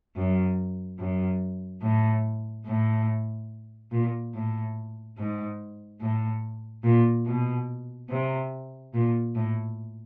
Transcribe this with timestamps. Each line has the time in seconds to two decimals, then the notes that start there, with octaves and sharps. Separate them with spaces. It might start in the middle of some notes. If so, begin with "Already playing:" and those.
0.16 F#2
0.99 F#2
1.82 A2
2.66 A2
3.91 A#2
4.34 A2
5.17 G#2
6.01 A2
6.84 A#2
7.26 B2
8.09 C3
8.94 A#2
9.35 A2